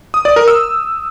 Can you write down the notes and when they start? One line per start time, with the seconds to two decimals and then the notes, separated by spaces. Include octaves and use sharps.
0.14 D#6
0.25 D5
0.36 A#4
0.48 E6